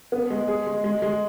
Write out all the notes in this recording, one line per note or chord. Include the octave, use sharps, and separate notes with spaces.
B3
G#3
G#4
G#3
G#3
G#3